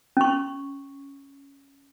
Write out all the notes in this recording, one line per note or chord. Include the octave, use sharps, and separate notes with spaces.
C#4 C#6